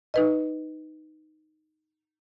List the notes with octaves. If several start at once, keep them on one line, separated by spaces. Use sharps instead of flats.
D#4 B4 D#5